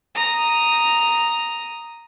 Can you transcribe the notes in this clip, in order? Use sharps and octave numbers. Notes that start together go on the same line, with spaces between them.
A#5 D#6